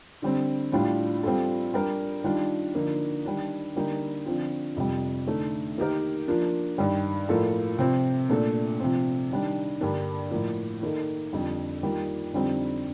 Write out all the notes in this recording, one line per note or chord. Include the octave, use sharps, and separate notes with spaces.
D3 G3 C4
A2 G3 D4 F4
G3 C4 F4 A4
G3 D4 G4 A#4
D#3 G3 D4 F4
D3 F3 A#3 D#4
D#3 G3 D4
D3 G3 A#3 D#4
D3 F3 C4 F4
F2 C3 G3
D3 A3 D#4 A4
D#3 A#3 D#4 G4 A#4
F3 A#3 D4
G2 D#3 G3
A2 F3 A#3 F4 A4
C3 F3 C4
A#2 A3 D4 A4
C3 F3 C4
D#3 G3 D4
G2 D3 G3 A#3 D4
A2 F3 A#3
D#3 A#3 D#4 A4
F2 D3 G3
D#3 G3 A#3 F4
F2 D3 G3 C4 D#4